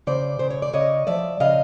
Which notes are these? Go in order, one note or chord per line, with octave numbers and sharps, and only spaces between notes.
C#3 C5 D5
C#3 C5
C#5
D5
C#3 C#5 D#5
F3 D5 E5
C#3 D#5 F5